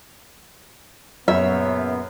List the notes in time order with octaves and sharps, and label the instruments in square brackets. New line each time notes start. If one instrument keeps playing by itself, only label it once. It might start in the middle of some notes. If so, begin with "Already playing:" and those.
[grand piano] F#2 [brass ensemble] A#2 C#3 B3 [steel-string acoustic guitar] C#5 [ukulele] E5